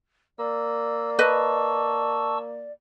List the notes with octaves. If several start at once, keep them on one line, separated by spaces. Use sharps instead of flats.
A#3 D5 E6
B4 D#5 A5 C#6 E6